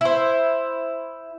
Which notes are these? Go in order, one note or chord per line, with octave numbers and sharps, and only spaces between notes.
E4 C5